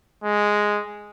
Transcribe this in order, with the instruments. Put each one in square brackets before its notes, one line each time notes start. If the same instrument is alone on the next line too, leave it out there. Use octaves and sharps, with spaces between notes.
[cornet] G#3